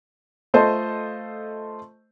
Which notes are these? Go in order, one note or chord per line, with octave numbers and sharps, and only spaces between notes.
A3 F4 A4 C5 D#5